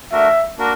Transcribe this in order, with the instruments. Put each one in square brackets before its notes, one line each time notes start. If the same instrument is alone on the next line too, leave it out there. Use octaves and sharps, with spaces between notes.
[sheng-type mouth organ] A3 D4 F#4 A#4 [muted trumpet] E5
[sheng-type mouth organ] A#3 D4 F#4 A#4